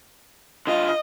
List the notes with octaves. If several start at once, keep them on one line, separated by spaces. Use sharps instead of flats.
D3 F4 D#5